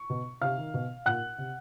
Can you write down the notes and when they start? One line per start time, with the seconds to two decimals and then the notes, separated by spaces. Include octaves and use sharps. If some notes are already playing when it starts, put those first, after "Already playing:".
Already playing: C#6
0.10 B2
0.42 C3 F5 F6
0.58 D#3
0.74 B2
1.06 A#2 F#5 F#6
1.38 C3